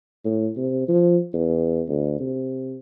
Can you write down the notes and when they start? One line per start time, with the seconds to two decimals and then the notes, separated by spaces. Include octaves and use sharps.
0.24 A2
0.57 C3
0.88 F3
1.33 E2
1.88 D2
2.20 C3